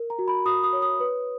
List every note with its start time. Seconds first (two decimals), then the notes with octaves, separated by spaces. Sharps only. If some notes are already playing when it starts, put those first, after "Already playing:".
Already playing: A#4
0.10 A#5
0.19 F#4
0.28 B5
0.45 F#4 D#6
0.63 D#6
0.73 C#5
0.82 D#6
1.00 B4